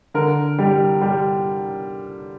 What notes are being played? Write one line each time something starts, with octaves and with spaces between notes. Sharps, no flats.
D3 A#4
G3
G3